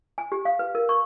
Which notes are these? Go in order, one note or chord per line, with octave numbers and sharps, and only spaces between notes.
G#5
G4
F5
B4
A#4
C#6